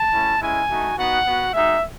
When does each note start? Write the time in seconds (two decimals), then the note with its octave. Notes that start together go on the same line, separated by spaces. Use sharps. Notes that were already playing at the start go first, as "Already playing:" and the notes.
Already playing: A5
0.12 A3 C#4 E4
0.41 G#3 C#4 E4 G#5
0.69 A3 D#4 F#4
0.97 B3 D#4 F#4 F#5
1.26 B3 F#4
1.53 G#3 D#4 F#4 E5